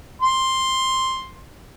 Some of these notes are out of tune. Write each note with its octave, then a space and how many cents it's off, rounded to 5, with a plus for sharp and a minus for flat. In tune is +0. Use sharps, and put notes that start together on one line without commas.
C6 +5